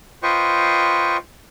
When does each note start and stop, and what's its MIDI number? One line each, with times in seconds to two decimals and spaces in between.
0.23 1.17 65
0.23 1.17 71
0.23 1.17 72
0.23 1.17 75
0.23 1.17 79
0.23 1.17 85